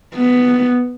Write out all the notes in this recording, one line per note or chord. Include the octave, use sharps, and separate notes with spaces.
B3